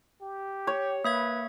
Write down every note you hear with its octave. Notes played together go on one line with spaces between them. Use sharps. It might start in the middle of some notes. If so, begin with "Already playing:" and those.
G4
C#5
A#3 B4 E5 G#6